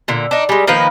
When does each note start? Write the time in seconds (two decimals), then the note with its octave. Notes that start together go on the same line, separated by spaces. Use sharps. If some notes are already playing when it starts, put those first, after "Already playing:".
0.08 A#2 D3
0.31 D4 D#4
0.49 G3 G#3
0.67 D#3 F3 A#3 B4